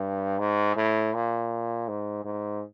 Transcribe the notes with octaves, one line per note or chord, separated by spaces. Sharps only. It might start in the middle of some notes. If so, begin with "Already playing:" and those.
Already playing: G2
G#2
A2
A#2
G#2
G#2